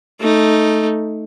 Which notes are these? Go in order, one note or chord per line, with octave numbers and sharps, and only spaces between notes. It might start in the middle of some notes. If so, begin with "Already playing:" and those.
A3 D#4